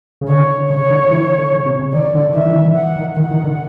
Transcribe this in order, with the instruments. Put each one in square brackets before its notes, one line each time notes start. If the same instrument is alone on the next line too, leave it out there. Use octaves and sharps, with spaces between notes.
[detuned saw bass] C#3
[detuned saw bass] D3 [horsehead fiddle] C#5
[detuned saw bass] C#3 [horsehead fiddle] C#5
[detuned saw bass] D3
E3
D3
C#3
C3
C#3
[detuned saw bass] D#3 [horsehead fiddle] D5
[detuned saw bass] D3
[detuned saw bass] D#3 [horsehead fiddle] E5
[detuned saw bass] E3
D#3
E3
[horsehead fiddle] F#5
[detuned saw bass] D#3
[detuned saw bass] D#3 [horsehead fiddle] F#5
[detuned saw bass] D#3
D3